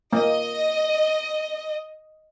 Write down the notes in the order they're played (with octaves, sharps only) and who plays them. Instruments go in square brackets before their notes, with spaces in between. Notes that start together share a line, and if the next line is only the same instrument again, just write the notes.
[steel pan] A#3 [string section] D#5